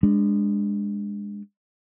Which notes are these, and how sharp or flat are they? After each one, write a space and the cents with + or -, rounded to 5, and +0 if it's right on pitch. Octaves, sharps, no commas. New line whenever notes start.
G#3 -20 D4 -5